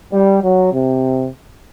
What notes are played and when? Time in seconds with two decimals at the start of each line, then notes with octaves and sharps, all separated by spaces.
0.13 G3
0.43 F#3
0.73 C3